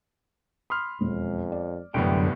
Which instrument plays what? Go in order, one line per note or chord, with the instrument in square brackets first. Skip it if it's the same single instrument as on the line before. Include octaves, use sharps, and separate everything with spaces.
[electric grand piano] B5 C6 F6 [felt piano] D#6
[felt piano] E1 [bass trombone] F2
[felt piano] D5
[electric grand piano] G1 A2 B3 [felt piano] C2 [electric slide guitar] F#2 D3 G5 [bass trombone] G3